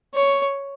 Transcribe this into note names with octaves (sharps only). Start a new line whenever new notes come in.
C#5